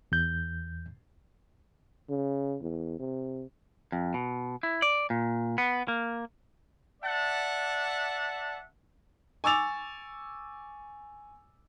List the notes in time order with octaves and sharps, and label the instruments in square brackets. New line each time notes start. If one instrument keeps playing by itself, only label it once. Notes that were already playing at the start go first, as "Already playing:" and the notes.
[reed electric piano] E2 G6
[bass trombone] C#3
E2
C3
[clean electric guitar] F2
B2
E4
D5
A#2
B3
A#3
[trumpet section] D5 E5 F#5 A5
[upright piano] G#5 C#6 D6 E6 A6 F7